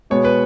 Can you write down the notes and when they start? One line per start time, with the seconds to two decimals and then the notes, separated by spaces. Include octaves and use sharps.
0.10 B2 G#3 B3 C#5
0.25 B4